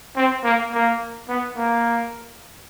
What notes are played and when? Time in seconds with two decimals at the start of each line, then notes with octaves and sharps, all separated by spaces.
0.16 C4
0.44 A#3
0.73 A#3
1.29 B3
1.57 A#3